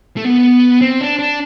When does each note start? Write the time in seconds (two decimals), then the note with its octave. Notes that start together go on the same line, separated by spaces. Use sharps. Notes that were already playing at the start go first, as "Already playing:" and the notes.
0.17 A3
0.25 B3
0.81 C4
1.01 D4
1.19 D4